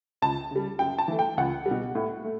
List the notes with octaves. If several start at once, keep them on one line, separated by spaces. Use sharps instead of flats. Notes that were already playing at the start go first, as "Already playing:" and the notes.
C#2 A5
C#3 G3
F#2 G5
A5
E3 A3
G5
C#2 F#5
G3
B2
A2
A3